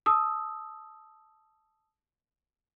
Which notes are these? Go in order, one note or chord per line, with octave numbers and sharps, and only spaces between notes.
A5 D#6 E6